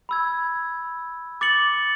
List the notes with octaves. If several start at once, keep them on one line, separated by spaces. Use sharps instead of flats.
B5 E6 G#6
D6 A6 C#7 F#7